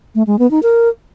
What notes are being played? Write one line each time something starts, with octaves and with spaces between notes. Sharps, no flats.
A3
G#3
B3
D#4
A#4